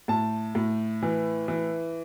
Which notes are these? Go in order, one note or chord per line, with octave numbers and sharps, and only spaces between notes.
A2 A5
A2
E3
E3